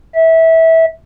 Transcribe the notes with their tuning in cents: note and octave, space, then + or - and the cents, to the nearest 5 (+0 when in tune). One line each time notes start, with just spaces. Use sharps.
E5 -20